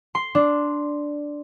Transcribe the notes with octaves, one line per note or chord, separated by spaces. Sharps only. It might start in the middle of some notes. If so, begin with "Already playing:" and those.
C6
D4